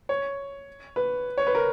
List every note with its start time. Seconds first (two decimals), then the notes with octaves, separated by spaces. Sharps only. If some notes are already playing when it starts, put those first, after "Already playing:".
0.09 C#5
0.96 B4
1.38 C#5
1.47 B4
1.55 A#4